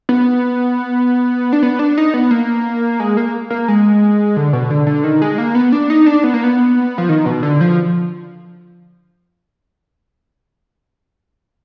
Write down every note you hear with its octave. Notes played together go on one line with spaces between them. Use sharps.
B3
D4
B3
D4
D#4
B3
A#3
G#3
A#3
A#3
G#3
D3
B2
D3
D3
D#3
G#3
A#3
B3
D4
D#4
D4
B3
A#3
B3
F3
D#3
B2
D3
F3